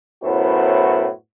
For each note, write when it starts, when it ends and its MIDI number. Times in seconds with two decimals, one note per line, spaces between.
0.23 1.09 42
0.23 1.09 45
0.23 1.09 59
0.23 1.09 64
0.23 1.09 66
0.23 1.09 72